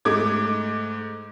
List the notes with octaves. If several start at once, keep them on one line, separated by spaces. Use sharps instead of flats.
G#2 G#3 A3 D6 G#6